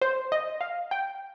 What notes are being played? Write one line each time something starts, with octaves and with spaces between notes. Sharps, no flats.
C5
D#5
F5
G5